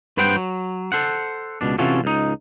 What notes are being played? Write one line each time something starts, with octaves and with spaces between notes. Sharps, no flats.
G2 B4 C5 F#5 G5
F#3
A4 C5 F#5
C#2 B2 D4
C3 E3 C#4 F4 F#4 A4
C#2 D#4